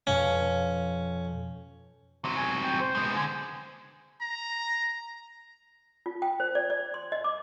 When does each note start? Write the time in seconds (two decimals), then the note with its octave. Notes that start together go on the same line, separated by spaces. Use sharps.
0.07 F2 B2 C#4 F5
2.25 F#3 C4
2.36 G#5
2.64 G5
2.80 C5
2.95 G#3 B3
3.15 D3 G#5
4.21 A#5
6.06 F4
6.22 G5
6.40 C5
6.55 D5
6.70 D5
6.94 C6
7.12 D#5
7.24 D6